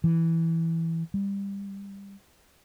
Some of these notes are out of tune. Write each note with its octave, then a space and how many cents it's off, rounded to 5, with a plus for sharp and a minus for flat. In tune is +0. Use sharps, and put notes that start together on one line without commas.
E3 +0
G3 +20